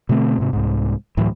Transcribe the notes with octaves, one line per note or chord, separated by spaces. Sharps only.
B2 D3 A3 C4
G#2 C3
C2 G#2
D2 A2 E3 F#3